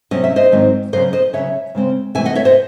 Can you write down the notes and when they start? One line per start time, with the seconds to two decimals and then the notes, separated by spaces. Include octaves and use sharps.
0.11 C3 F#3 C#4 D#5
0.24 E5
0.36 C5 D#5
0.52 G#2 D#3 F#3 C4
0.93 C#3 F#3 C#4 C5 D#5
1.13 C5 D#5
1.33 C#3 F#3 C#4 C#5 E5
1.75 C#3 G#3 C4
2.15 C3 E3 A3 E5 G#5
2.25 D#5 F#5
2.35 C#5 E5
2.45 C5 D#5